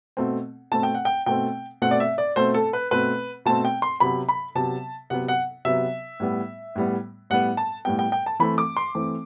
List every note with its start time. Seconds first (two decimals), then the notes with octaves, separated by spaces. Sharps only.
0.17 B2 A3 C4
0.72 B2 A3 C4 A5
0.83 G5
0.94 F#5
1.05 G5
1.26 B2 A3 C4 G5
1.82 B2 A3 C4 F#5
1.91 D5
2.00 E5
2.18 D5
2.36 B2 A3 C4 C5
2.54 A4
2.73 B4
2.91 B2 A3 C4 B4
3.46 B2 A3 C4 A5
3.65 G5
3.82 C6
4.00 C3 F#3 B3 B5
4.29 B5
4.55 C3 F#3 B3 A5
5.10 C3 F#3 B3 F#5
5.28 F#5
5.65 C3 F#3 B3 E5
6.20 A2 G3 B3
6.76 A2 G3 B3
7.30 A2 G3 B3 F#5
7.57 A5
7.85 A2 G3 B3 G5
7.99 G5
8.12 G5
8.26 A5
8.40 E3 A3 C4 B5
8.58 D6
8.77 C6
8.95 E3 A3 C4